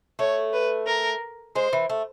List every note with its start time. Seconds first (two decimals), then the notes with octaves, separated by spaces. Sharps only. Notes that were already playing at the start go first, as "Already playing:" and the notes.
0.19 A3 C#5
0.53 B4
0.87 A#4
1.55 G#3 C5
1.73 E3
1.90 A3